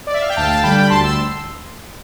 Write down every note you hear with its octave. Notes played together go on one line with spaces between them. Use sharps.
D5
E5
F5
G5
D2 F5 A5
G5
F5 A5
D3 G3 G5 B5
G5 B5
D2 A5 C6
C6 E6